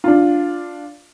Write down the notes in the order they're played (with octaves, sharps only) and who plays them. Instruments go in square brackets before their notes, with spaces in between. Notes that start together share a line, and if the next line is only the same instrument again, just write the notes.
[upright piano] D4 F4